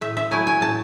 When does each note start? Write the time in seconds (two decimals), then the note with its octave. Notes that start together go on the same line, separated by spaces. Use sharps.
0.01 A2 E5
0.17 E5
0.31 F#3 A3 E4 G#5
0.47 G#5
0.61 A2 A5